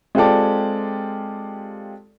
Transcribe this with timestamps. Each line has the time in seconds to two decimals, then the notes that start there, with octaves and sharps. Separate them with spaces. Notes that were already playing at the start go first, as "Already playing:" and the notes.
0.15 G#3 C4 F4 G4 A4 D5